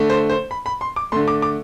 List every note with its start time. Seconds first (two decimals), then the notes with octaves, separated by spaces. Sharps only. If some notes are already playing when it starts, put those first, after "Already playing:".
Already playing: D3 A3
0.10 C5
0.30 C5
0.51 B5
0.66 B5
0.81 C6
0.96 D6
1.12 D3 A3 C6
1.28 D6
1.42 D6